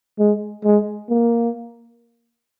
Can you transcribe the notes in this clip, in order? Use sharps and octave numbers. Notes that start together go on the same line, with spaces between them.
G#3
G#3
A#3